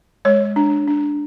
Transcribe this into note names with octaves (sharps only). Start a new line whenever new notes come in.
G#3 C#5
D4
D4